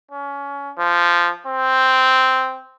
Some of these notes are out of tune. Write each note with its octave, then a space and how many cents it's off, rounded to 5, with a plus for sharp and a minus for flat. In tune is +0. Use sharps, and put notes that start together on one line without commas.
C#4 +25
F3 -10
C4 -5